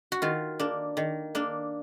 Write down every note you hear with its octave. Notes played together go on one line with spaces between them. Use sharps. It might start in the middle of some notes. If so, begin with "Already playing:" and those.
F#4
D#3 F4
A#3 D4
D#3
A#3 D4